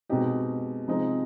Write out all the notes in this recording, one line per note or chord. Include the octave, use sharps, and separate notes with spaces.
B2 G#3 C4 D#4 G4
C3 F3 G#3 C4 D#4